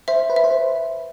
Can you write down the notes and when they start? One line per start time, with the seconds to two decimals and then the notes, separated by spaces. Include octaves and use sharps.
0.08 C5 E5
0.30 B4
0.36 E5
0.44 C5
0.50 B4